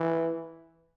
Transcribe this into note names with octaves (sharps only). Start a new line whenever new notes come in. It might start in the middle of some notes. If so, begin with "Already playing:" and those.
Already playing: E3